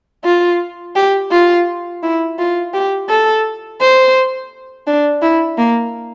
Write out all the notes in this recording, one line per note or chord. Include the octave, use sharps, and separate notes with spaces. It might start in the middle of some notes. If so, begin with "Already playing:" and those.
F4
G4
F4
E4
F4
G4
A4
C5
D4
E4
A#3